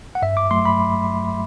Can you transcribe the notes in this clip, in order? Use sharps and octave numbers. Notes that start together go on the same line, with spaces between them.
F#5
G2 E5
D6
F#3 A3 C6
B5